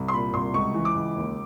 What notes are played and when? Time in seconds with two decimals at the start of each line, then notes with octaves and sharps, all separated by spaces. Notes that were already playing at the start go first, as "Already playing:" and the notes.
Already playing: C2
0.08 C6
0.13 A#2 B5
0.33 C2 C6
0.54 C#2 C#6
0.74 E3
0.85 D6
0.95 C#2
1.16 D#2